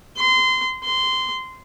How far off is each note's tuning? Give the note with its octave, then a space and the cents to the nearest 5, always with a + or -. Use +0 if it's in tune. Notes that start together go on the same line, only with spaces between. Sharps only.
C6 -25
C6 -15